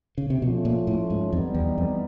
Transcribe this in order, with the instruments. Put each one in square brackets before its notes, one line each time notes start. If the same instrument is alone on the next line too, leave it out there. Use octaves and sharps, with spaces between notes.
[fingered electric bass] C#3
C3
[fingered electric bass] B2 [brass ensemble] F3 A3 C#4 F4
[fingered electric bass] A#2
A2
G#2
[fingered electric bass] F2 [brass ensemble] E3 G3 B3 D#4
[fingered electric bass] E2
F2